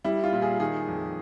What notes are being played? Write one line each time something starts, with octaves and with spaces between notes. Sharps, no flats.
G3 E4
F4
A#2
G#4
D#3 G#4
F2